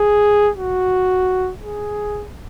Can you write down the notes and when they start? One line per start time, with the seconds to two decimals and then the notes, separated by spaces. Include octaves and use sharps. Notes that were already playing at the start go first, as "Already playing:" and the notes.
Already playing: G#4
0.57 F#4
1.63 G#4